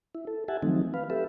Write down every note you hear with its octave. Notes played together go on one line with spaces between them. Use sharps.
E4
A4
G4 E5 F#5 G#5 A5
D#3 F3 F#3 A3 C4 D#4
B4 F5
G4 A4 B4 E5